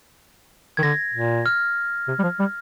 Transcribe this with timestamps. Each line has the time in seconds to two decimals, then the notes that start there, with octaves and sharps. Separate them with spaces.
0.77 D#3 G#6
0.83 D3 A#6
1.14 A#2
1.46 F6
2.08 C3
2.19 G3
2.23 F3
2.40 G3